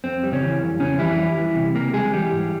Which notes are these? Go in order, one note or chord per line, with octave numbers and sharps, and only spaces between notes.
F2 C4
G3
C#3 C#4
E3
F2
F2 C#3 C#4
E3 G3 E4
G3
E3
C3
C#2 A#3 A#4
G3 G#3 G#4
E3 G3 G4
G#2